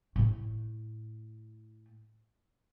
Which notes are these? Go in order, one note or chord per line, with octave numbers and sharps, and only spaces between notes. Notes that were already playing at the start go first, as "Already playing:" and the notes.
A2 A3